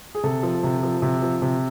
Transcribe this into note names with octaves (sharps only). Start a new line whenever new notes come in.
G#4
C3 A4
F3
C3
F3
C3
F3
C3